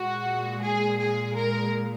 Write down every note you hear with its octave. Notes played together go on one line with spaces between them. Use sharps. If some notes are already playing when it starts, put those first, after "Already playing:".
Already playing: A#2 G#3 F#4
G#4
G#4
A#4